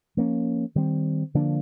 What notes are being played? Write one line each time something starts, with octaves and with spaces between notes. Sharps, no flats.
F3 A#3 C#4
D#3 G3 C4
D3 F3 A#3 D4